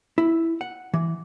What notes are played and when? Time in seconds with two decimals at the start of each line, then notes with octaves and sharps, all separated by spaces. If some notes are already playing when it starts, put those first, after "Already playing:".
0.18 E4
0.61 F#5
0.94 E3